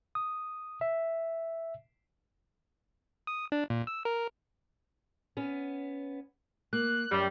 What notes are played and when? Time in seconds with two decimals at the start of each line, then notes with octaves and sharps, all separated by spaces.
0.15 D#6
0.81 E5
3.27 D#6
3.52 D4
3.70 A#2
3.87 E6
4.05 A#4
5.37 B3 C#4
6.73 A#3 F#6
7.12 F#2 G3